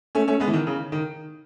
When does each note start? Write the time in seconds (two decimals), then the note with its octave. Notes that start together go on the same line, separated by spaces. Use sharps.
0.15 A3 C#4
0.28 A3 C#4
0.40 G#3 B3
0.47 E3
0.53 D#3
0.67 C#3
0.92 D#3